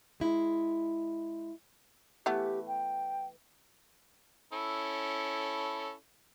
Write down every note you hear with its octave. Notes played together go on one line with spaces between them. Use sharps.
G#3 E4
E3 A3 B3 G4
G5
C#4 E4 A4